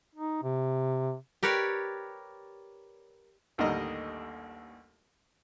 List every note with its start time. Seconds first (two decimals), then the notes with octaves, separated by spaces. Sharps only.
0.15 D#4
0.43 C3
1.43 G4 A#4 B4 C#5 D5
3.58 A1 D#2 D3 G3 A#4 D#5